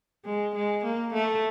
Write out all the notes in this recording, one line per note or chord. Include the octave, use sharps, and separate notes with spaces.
G#3
G#3
A#3
A3